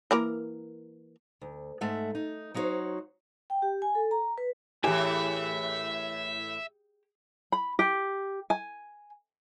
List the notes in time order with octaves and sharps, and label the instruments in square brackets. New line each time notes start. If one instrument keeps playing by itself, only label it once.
[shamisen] E3 A#3 A#4
[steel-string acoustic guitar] D2
G#2 G#3 A3 E5 F#5
D#4
F#3 D#4 E4 F#4 C5 C#5
[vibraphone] G5
G4
G#5
A4
A#5
B4
[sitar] A2 E3 [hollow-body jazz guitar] G4 G#4 [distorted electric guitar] E5
[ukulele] B5
G4
G#5